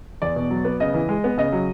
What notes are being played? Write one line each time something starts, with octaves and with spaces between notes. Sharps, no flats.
E2 D5
B2
F#3
B3
C#3 D#5
E3
G#3
B3
C#3 D#5
F#3